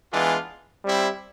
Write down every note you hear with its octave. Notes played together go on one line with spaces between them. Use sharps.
E3 G#3 B3 D4 F4
G3 C4 E4